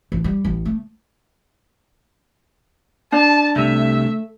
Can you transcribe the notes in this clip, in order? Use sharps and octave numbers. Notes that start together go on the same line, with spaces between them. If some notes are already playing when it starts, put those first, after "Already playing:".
A1
G3
A1
A3
D4 A5
C2 C3 A3 E5